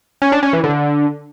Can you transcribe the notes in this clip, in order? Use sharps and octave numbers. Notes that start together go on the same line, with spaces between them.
C#4
D4
C#4
E3
D3